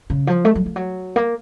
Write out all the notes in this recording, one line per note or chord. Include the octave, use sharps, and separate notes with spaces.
C#3
F3
A3
F#3
F3
F#3
A#3